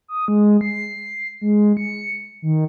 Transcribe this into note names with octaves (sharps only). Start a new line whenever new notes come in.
D#6
G#3
C7
G#3
C#7
D#3